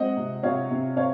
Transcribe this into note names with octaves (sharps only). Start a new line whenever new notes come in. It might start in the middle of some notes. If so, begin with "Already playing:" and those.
Already playing: G#3 C4 D#5 F#5
C3
C3 C#5 F5
C3
C4 C#5 F5